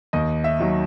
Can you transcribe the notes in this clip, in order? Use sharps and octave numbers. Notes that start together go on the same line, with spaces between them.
D#2 D#5
E5
D#3 F#3